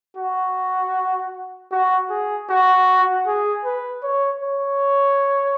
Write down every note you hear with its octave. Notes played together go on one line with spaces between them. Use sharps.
F#4
F#4
G#4
F#4
G#4
B4
C#5
C#5